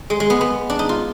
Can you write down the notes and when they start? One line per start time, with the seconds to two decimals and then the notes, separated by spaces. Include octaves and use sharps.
0.10 G#3
0.20 G#3
0.30 B3
0.41 B3
0.70 D4
0.79 D#4
0.89 F4